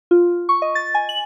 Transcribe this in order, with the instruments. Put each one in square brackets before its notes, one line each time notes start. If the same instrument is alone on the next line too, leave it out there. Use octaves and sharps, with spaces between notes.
[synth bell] F4
C#6
D#5
A6
G#5
F#7